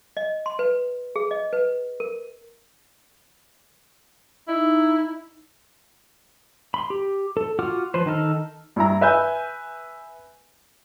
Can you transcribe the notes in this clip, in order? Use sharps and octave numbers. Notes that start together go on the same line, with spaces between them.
D#5
C6
B4
G#4
D#5
B4
A#4
D#4 E4
B5 C6
G4
A4
F4 F#4 F#5 D6 F6
F3 B4 C5
D#3 D#4 A4 F6
G2 E4 A#5
B4 E5 G#5 G6